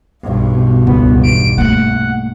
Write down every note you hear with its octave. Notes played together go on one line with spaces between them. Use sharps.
B1 G2
B2
C#2 B3
E2 D7
A3 A#3 F#5